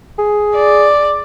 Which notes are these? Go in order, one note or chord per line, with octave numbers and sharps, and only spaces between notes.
G#4
D5